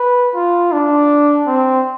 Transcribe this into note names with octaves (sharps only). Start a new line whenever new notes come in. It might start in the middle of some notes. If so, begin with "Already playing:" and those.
Already playing: B4
F4
D4
C4